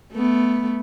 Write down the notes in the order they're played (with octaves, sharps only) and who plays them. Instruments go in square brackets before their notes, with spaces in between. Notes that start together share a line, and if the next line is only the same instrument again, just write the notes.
[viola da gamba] A3 B3